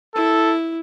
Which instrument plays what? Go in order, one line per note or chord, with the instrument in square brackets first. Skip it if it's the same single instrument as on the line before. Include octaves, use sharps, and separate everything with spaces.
[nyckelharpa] E4 [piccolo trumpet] A4